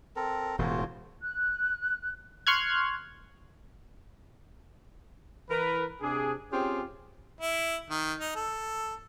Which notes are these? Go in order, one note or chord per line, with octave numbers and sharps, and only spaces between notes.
C4 A4 A#4
E1 E2 A2 F4 F#4 C5
F#6
C6 C#6 F6 F#6 G#6
E3 A#4 B4
C3 D4 G#4
C4 C#4 F4 G4 G#4 C5
E4
D#3
D#4
A4